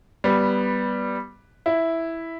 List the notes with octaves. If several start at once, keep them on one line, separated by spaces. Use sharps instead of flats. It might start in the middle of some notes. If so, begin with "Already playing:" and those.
G3 B3
E4